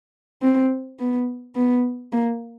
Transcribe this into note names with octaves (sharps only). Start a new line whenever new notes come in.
C4
B3
B3
A#3